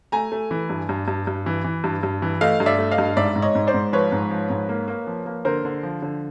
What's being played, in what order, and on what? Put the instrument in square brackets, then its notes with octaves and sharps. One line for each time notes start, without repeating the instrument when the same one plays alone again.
[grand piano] A3 G#5 A#5
A3
E3
G2
G2
G2
G2
E3
E3
G2
G2
E3
A3 D#5 F5
G2
D5 E5
A3
D#5 F5
G2
G#2 D5 E5
G#2
C#5 D#5
G#2
C5 D5
G#2
F3 B4 C#5
G#2
F3
G#2
A#3
A#3
F3
A#3
D3 A#4 C5
D3
F3
D3